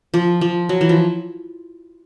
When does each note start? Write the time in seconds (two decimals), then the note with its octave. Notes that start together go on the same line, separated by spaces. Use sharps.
0.14 F3
0.41 F3
0.69 F#3
0.81 E3
0.89 F3